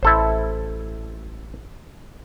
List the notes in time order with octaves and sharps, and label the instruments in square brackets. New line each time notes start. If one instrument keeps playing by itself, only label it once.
[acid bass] A1 [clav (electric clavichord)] E4 A4 C5